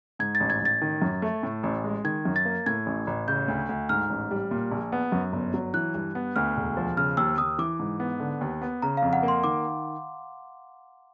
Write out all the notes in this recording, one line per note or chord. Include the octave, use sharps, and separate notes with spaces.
G#2 G#6
A6
A1
G#6
A1 A6
D#3
F#2
A3
A2
A1
G#3
D#3 G#6
F#2
A6
A#3
A2 G#6
A1
A1
C#3 G6
D2
D2
G#2 F6
A1
G3
A#2
A#1
B3
F#2
G1
F#3
E3 F#6
G2
B3
D2 F6
E1
F3
C#3 F6
D#2 E6
D#2 D#6
E3 D6
G#2
B3
D3
D#2
B3
C#3 A#5
F2 F5
F#5
A#3
C6
D#3 D6